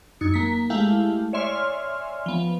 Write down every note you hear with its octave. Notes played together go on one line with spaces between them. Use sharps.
F#2 D#4 C#7
A#3 B6
G#3 A3 E4 G4 F5
C#5 D5 E5 G#5 C6 F6
F3 B3